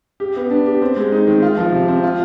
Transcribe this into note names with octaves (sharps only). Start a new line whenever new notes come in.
G4
B3
D4
G4
C4
G#3
D#4
D#3
F4
F3
C3
C4
F4